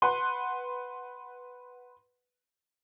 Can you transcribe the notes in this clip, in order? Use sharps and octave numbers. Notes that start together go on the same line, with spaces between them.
B4 F#5 C6